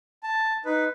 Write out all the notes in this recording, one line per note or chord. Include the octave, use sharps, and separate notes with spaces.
A5
D#4 B4